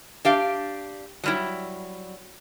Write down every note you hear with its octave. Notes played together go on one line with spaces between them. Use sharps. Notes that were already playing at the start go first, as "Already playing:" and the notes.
D4 G4 F5
F#3 G3 E4